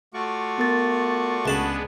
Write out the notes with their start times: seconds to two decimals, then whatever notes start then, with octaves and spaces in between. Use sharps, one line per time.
0.14 A3 F4 F#4 D5 C#6
0.58 B3 A#4 A6
1.46 C#2 G#3 B3 D4 A5 B5